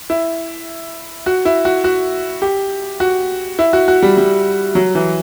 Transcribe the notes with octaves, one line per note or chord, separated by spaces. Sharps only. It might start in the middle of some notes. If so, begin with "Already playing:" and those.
E4
F#4
E4
F#4
F#4
G4
F#4
E4
F#4
F#4
G3
G3
F#3
E3